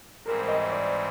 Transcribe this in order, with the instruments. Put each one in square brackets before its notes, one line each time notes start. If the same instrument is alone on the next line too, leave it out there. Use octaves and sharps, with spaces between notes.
[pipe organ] G#2 E3 G3 C4 [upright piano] A#4
[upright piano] D#5
D5